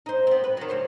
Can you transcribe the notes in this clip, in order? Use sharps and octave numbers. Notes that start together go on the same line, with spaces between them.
D#4 C5
B3 C4
B4
D#3 F#3
D2 C5 C#5